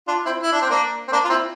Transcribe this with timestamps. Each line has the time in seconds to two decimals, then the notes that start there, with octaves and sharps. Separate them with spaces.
0.08 D4 F4
0.26 C4 E4
0.43 E4
0.52 D4
0.62 C4
0.70 A#3 D4
1.08 C4
1.12 A#3 D4
1.24 F4
1.30 C4 E4